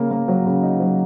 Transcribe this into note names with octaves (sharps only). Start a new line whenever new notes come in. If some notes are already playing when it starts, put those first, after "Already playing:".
Already playing: C#3 A#3
A#3
F#3
C#3
D#4
F#3